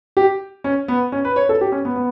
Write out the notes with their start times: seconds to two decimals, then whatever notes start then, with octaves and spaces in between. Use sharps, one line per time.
0.17 G4
0.64 C#4
0.88 B3
1.12 C#4
1.25 B4
1.36 C#5
1.49 A4
1.61 G4
1.72 C#4
1.85 B3
1.96 B3